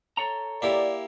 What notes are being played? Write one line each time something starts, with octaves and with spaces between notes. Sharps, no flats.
A4 C#5 A#5
A#3 E4 G4 D5